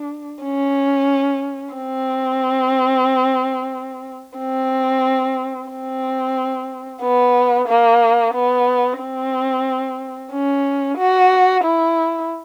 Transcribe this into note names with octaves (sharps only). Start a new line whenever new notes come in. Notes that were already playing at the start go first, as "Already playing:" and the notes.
Already playing: D4
C#4
C4
C4
C4
B3
A#3
B3
C4
C#4
F#4
E4